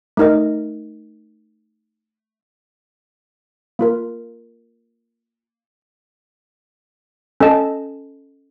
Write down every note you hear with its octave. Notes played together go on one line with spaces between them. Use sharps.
A3 D#4 A#4 D#5
A#3 F4 A#4
C#4 A4 D#5 A5